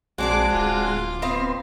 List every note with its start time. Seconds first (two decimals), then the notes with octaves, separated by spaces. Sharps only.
0.18 A#1 G#3 C4 D4 F#4 G#4 D6
0.52 D1 F4 D6
1.22 B3 C4 D#4 F5 C6